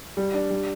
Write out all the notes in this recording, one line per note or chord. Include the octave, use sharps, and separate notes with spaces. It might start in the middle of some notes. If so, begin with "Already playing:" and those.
G3
D4
G3